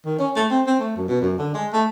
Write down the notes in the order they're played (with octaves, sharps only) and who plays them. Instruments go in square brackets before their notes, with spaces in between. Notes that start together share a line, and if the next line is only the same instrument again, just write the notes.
[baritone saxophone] D#3
C#4
A3
C4
C4
A3
F#2
B2
F#2
D3
G#3
A3